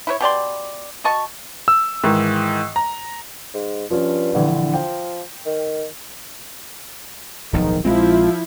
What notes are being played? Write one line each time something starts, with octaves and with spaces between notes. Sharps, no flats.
E4 B4 C#5
B2 G4 D5 C6
F#4 D#5 A5 C#6
E6
G#2 D#3 E3
A#5
G#2
G2 F3 C#4
A#1 D3 E3
F3 G5
D#3
D1 B1 G#2 D#3 F3
A#1 F3 G#3 C4 E4 F4